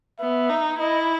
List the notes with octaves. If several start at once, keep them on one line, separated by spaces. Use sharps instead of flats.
B3 E5
D#4
E4 D#5